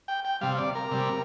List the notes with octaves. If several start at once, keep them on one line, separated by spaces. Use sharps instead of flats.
G5
G5
C3 G3 F5
D5
A#4
C3 G3